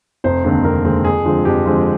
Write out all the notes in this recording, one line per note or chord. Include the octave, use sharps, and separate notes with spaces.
F1 C5
D#2 D3 G#3 C4
F1 A#4
D#2 D3 G#3 C4
F2 G#4
D3 F3 G#3 C4
F2 G4
D3 F3 G#3 C4